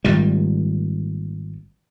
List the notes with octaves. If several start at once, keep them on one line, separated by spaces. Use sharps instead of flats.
G#1 A#2 G3